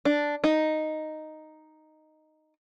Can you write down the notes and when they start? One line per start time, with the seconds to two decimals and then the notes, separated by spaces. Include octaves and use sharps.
0.05 D4
0.44 D#4